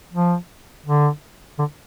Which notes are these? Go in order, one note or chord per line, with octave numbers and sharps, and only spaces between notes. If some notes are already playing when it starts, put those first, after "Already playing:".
F3
D3
D3